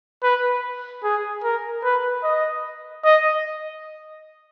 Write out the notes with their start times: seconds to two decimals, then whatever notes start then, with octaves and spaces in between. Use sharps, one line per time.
0.23 B4
1.04 G#4
1.44 A#4
1.84 B4
2.24 D#5
3.05 D#5